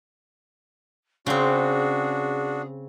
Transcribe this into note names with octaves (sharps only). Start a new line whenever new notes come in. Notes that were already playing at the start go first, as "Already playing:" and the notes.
C#3 C4 D4 F#4 G#4